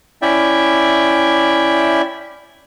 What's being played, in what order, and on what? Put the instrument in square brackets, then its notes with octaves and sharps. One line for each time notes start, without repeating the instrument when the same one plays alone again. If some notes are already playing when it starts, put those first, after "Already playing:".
[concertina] C#4 E4 D5 E5 G5